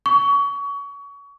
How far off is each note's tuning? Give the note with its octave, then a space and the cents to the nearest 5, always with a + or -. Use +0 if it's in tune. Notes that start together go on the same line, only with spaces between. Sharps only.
C#6 +30